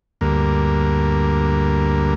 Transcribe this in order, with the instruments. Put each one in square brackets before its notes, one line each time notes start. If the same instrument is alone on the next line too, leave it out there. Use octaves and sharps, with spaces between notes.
[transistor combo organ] D2 G2 A#3